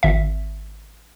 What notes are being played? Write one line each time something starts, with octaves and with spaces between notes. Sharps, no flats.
G#1 E5